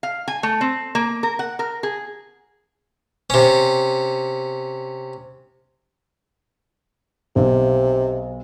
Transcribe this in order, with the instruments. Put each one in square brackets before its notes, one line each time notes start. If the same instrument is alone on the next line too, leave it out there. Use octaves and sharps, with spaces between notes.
[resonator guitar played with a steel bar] F5
G#5
A3
C4
A#3
A#4
F#5
A#4
G#4
[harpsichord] C3 C#4
[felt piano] B1 [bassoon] C3